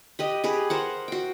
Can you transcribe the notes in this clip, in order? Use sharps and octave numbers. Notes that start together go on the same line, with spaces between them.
G4 B4 D#5
G4 G#4 B4
A#4 C5 F#5
F#4 G5